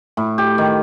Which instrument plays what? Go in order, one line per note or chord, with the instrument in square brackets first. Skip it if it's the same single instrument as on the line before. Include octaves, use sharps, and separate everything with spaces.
[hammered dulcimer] A2
G4
D#3